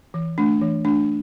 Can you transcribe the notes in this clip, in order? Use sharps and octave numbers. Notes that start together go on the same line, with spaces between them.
E3
A3 D4
E3
A3 D4